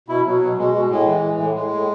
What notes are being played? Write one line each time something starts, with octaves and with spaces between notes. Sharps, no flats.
B2 E4
B2 F#3
B2
B2 G#3
B2
A2 G#3
E3
E3
A2
A2 G#3
A2